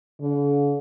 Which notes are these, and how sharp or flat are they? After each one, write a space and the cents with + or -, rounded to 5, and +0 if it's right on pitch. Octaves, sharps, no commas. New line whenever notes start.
D3 -45